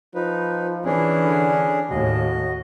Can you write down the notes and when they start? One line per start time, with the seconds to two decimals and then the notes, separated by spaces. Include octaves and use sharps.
0.15 F3 D#4 B4
0.85 E3 C#4 D4 G#4
1.24 D3
1.90 D#2 A2 F#4 D#5